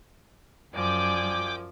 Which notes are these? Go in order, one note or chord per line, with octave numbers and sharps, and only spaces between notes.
F#2 F3 D5 G5 G#5 D6